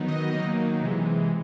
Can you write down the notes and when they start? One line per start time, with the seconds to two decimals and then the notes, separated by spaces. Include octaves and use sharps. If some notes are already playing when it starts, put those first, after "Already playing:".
Already playing: D#3 F#3 B3 D#4
0.08 D#5
0.32 D#3 F#3 A#3 D#4
0.81 C3 E3 G#3